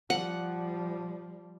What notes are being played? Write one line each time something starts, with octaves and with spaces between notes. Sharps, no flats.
F3 G3 F#5